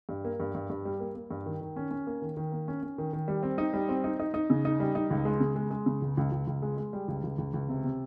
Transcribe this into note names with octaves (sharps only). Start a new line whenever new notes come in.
G2
A#3
G2
G2
G2
G3
A#3
A#3
G2
D#3
D#3
C#4
C#4
A#3
D#3
D#3
A#3
C#4
C#4
D#3
D#3
G3
C4
D#4
G3
C4
D#4
D#4
D#4
C#3
D#4
G3
D#4
C#2
G#3
C#3
G#3
G#3
C#3
C#2
C#2
C#2
C#2
G#3
G#3
G3
C#2
C#2
C#2
C#2
C3
C3